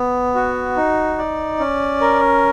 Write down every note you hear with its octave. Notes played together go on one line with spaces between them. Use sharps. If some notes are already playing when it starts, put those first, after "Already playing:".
Already playing: B3
F#4
D#4
D5
C#4
A#4